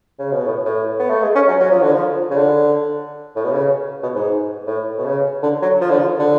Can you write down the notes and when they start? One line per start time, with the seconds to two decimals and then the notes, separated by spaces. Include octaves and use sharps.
0.19 C#3
0.32 B2
0.46 A2
0.65 A2
0.99 B3
1.10 A3
1.22 G#3
1.35 C#4
1.48 F#3
1.61 F#3
1.71 F3
1.82 D3
1.93 F3
2.31 C#3
2.38 D3
3.36 A2
3.44 B2
3.52 C#3
4.03 B2
4.15 G#2
4.67 A2
4.98 B2
5.05 C#3
5.43 D3
5.62 F#3
5.81 F3
5.90 D3
5.99 F3
6.19 D3